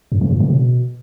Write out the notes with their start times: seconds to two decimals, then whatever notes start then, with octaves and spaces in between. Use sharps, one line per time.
0.12 F#2
0.21 C#3
0.31 A2
0.40 C#3
0.50 B2